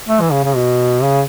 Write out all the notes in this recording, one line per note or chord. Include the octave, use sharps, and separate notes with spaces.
A3
E3
C#3
C#3
B2
C#3